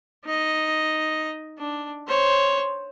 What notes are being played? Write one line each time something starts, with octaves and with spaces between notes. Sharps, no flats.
D#4 D#5
D4
C5 C#5